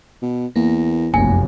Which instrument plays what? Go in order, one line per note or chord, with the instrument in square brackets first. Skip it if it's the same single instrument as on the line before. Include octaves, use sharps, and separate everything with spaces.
[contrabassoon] B2
[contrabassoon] E2 [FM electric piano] A#3
[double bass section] F1 B1 F#2 [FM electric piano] A#3 [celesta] G#5